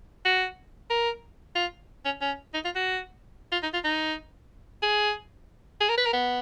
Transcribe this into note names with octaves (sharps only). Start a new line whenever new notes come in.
F#4
A#4
F4
C#4
C#4
D#4
F4
F#4
F4
D#4
F4
D#4
G#4
G#4
A#4
B4
A#4
B3